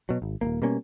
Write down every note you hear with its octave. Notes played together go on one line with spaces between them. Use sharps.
B2 F#3
G#1
D#1 F2 A#3
B2 G3 A#3 C#4